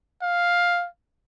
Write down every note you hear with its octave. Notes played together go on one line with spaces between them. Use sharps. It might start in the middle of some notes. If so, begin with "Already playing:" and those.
F5